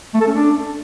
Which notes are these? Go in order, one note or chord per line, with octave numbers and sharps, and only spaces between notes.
A3
A4
C#4
D4